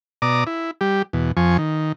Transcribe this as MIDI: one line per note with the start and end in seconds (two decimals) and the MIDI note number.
0.22 0.44 47
0.22 0.44 74
0.22 0.44 82
0.22 0.44 86
0.22 0.44 87
0.47 0.71 64
0.81 1.02 55
0.81 1.02 67
1.13 1.32 40
1.13 1.32 47
1.37 1.57 41
1.37 1.57 53
1.37 1.57 80
1.37 1.57 85
1.58 1.92 51